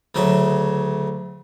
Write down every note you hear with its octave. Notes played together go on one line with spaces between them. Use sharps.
D2 C#3 F#3 E5